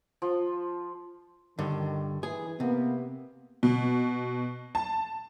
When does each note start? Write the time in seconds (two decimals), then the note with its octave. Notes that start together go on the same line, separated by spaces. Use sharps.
0.22 F3
1.59 G2 D3 D#3
2.23 E3 G#4
2.60 C3 A#3 B3
3.63 B2
4.75 A5